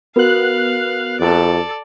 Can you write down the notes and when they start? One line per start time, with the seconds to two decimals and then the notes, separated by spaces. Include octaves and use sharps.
0.16 B3 F#4 A#4 F5 F#6
1.20 F2 A4 D5